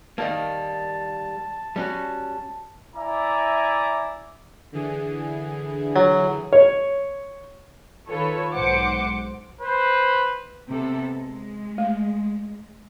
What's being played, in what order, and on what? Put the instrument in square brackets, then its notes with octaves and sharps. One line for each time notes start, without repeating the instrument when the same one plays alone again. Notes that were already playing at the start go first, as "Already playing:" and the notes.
[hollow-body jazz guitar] D#3 G3 A#3 [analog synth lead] A5
[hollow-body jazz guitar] G3 C#4 F#4
[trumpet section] E4 D5 E5 G#5 A#5 D6
[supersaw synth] D3 E3 G#4
[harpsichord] F#3
[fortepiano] C#5
[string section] D#3 F4 A4 B4 C#5
B1 G#2 C5 F#5 D6 C#7
[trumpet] B4 [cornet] C5
[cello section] C3 B3 A4
G#3
[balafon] A3